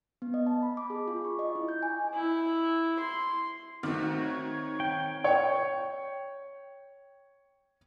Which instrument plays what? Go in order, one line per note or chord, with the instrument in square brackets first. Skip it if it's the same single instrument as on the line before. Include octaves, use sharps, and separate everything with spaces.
[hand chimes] B3
D#5
A5
B5
D6
G#4
F4
C#6
D#5
E4
G6
G#5
[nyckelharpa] E4
C6
[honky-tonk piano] D#3 [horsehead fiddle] A3 F#4 [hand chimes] C4
[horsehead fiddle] C#5
[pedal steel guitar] G5
[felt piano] C#5 G5